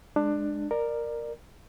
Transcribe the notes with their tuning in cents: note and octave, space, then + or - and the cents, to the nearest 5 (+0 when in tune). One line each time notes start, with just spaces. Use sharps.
G#3 +0 D4 +15
A#4 +0 D5 +20